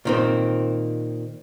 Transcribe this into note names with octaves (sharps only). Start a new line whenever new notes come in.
A#2 D#3 C4